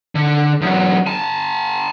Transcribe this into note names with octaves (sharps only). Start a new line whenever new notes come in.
D3
E2 F#3
G#5 A5